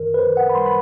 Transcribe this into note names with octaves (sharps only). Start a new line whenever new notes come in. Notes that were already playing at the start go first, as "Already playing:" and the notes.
Already playing: F#2 D#3 A#4
B4
D#3 C5
F#5
B5
G3 C6
B5